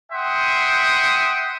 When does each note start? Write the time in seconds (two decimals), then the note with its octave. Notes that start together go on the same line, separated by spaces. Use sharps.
0.12 E5 F#5 G5 C6 D#6